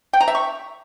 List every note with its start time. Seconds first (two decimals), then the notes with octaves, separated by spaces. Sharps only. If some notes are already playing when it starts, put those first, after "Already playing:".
0.13 G5
0.21 A#5
0.28 E5
0.35 C#6